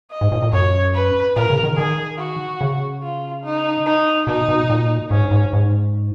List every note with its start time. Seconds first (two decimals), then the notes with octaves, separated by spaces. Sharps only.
0.11 D#5
0.21 G#2
0.32 A#2
0.42 A#2
0.52 F#2 C#5
0.94 B4
1.36 A#2 A#4
1.50 C#3
1.63 D#3
1.78 D#3 G#4
2.19 F#4
2.61 C#3
3.03 F4
3.44 D#4
3.86 D#4
4.27 B2 D#4
4.49 B2
4.70 A#2
5.11 G#2 C#4
5.31 G#2
5.53 G#2